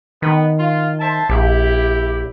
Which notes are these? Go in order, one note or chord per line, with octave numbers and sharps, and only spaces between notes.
D#3 B3
F4
C5 E5 A5
A#1 E4 G4